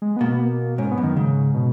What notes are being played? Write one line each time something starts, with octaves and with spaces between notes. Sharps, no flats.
G#3
B3
B2 A#3
B3
A#3
G#2 C#4
B3
F#2
D#3
G#2 C#3
B2